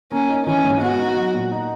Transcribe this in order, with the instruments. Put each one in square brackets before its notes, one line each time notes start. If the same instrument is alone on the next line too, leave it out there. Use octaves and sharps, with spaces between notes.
[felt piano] A#3 [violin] C#4
[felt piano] D#4
[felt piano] E3 [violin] C#4
[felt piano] G#2
[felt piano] B3 [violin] F#4
[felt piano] D#4
F#3
A#2
D#4